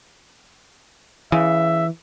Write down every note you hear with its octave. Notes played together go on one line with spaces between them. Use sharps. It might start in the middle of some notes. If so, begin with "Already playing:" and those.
C#3 E3 E5